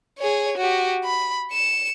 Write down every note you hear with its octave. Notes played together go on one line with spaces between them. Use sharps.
G#4 C#5
F#4 G4
B5
C#7 E7